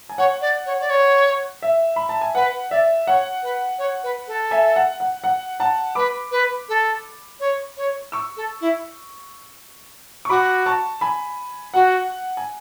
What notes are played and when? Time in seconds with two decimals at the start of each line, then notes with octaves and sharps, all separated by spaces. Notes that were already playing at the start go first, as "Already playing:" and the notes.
0.09 G#5
0.18 C#5 F#5
0.41 D5
0.66 C#5
0.81 D5
0.90 C#5
1.62 E5
1.96 B5
2.09 A5
2.21 G#5
2.35 B4 F#5
2.70 D5 E5
3.07 C#5 F#5
3.43 B4
3.79 C#5
4.03 B4
4.28 A4
4.51 E5 G#5
4.76 F#5
5.00 F#5
5.24 F#5
5.60 F#5 A5
5.95 B4 B5 D6
6.31 B4
6.69 A4
7.40 C#5
7.77 C#5
8.12 C#6 E6
8.37 A4
8.61 E4
10.25 C#6
10.29 F#4 B5 D6
10.66 A5 C#6
11.01 G#5 B5
11.74 F#4 F#5
12.37 G#5